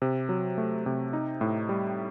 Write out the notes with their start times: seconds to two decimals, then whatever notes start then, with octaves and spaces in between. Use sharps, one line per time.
0.02 C3
0.29 F#3
0.58 A3
0.86 C3
1.13 D#4
1.41 A2
1.69 G3